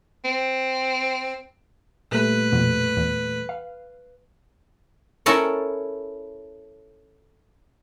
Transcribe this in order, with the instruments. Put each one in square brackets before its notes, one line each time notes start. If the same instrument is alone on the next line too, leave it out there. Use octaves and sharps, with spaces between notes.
[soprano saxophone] C4
[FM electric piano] A#2 G3 A3 [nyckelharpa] B4
[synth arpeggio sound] F2 B2
E2
F5
[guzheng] C#4 E4 A4 A#4 C#5